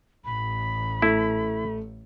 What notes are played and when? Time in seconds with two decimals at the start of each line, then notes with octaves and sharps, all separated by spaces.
0.25 A1 B5
1.02 A3 E4